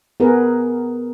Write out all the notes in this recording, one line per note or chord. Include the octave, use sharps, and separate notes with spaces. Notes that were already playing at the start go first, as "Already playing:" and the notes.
B3 G#4 A#4 B4